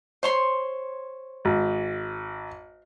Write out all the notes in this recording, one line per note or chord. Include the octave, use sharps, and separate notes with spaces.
C5 C#5 C6
G#1